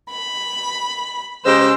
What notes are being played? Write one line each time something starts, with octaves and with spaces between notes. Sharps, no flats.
B5
C#3 G#3 G4 C5 E6 A#6